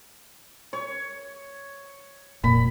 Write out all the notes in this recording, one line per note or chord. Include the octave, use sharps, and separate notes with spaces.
C#5
F1 A#2 B5